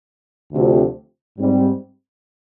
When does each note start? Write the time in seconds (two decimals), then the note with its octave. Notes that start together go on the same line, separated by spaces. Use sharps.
0.52 D2 C3 F3
1.38 G#2 G3 C4